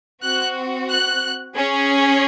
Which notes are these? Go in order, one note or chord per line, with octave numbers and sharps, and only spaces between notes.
C4 F#4 F#6
F#6
C#4 G#4